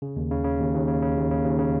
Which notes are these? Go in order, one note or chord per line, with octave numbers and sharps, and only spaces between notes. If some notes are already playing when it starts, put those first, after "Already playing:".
C#3
D#2
C#3
C#3
D#2
D#2
C#3
C#3
D#2
C#3
D#2
C#3